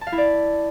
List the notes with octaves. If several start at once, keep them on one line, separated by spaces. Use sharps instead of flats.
A5
F5
E4
D5